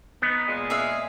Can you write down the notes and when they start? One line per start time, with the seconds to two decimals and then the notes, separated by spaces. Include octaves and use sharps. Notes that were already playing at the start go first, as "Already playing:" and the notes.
0.22 B3 D#4
0.47 A#2 G#3
0.70 G#4 E5 F5